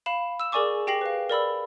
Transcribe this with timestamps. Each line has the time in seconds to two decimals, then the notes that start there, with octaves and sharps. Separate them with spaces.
0.06 F5 B5 E7
0.40 E6 E7
0.52 G#4 A#4 D5 G#5 C#6 D6
0.87 G4 G5 A#6 C7 F#7
1.01 B4 F5
1.29 A#4 D5 B5 E6